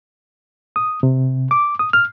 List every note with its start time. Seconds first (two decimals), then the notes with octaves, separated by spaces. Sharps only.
0.76 D#6
1.03 C3
1.51 D6
1.79 D#6
1.93 F6